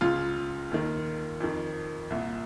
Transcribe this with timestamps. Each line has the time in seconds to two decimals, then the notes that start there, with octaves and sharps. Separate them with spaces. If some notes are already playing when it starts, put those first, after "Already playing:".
0.01 C#2 C#3 F4
0.71 D#2 D#3
1.40 F2 D#3
2.10 C2 A#2